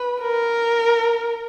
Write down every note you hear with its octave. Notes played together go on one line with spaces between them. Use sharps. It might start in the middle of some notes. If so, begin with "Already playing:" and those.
Already playing: B4
A#4